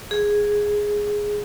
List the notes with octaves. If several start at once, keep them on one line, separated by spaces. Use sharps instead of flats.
G#4